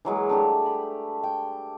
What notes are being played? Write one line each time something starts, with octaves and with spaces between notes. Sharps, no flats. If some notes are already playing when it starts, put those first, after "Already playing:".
E3 F#3 G#3 A#3
A3 D4 G4
B5
G5